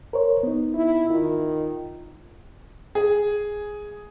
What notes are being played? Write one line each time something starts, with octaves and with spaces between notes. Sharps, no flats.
A#4 C5 C#5
B3 D#4
E4
D#3 F4
G#4